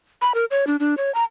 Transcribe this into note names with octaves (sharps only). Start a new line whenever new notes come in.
B5
A#4
C#5
D4
D4
C#5
A#5